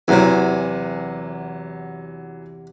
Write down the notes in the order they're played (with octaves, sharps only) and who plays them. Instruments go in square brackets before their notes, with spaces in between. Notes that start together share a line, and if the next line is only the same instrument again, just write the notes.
[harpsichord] E2 C3 [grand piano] E3 F#3